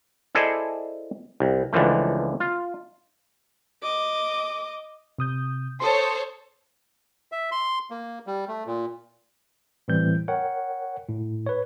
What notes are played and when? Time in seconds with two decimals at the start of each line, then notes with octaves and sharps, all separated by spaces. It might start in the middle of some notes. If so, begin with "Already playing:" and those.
0.35 E4 G#4 A4 C5 D5 D#5
1.40 C2
1.73 C#2 D3 E3 F3 A3
2.40 F4
3.83 D#5 D6
5.18 C3 D#6 G6
5.80 A4 C5 C#5 C6 D#6
7.32 E5
7.52 C6
7.91 A#3
8.27 G3
8.48 A3
8.66 A#2
9.88 A2 E3 G3 C4 G6
10.28 A#4 C#5 F#5 G5
11.08 A2
11.47 B4 C#5